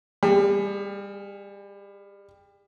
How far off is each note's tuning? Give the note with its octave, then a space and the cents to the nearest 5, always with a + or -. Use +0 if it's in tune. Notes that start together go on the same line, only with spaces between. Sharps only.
G3 +30 G#4 +0